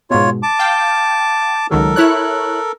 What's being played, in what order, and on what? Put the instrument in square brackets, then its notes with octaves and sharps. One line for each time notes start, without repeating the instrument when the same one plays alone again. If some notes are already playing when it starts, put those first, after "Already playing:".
[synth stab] G#2 B2 [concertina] F4 C#5
[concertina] A5 D6
[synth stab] F5 G5
[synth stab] C#2 D#3 F#3 [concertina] A4 A#4
[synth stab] E4 C#5 F#6